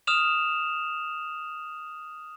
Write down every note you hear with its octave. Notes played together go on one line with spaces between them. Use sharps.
D#6 F6 E7 F7